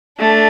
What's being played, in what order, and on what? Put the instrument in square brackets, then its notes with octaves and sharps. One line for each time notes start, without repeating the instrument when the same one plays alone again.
[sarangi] A3 [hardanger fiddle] D4